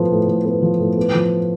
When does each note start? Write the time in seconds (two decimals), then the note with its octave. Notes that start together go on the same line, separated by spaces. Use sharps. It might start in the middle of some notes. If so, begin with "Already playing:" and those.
Already playing: A2 F3 B3
0.11 A2
0.28 A2
0.45 B3
0.62 F3
0.80 A2
0.97 B3
1.14 F3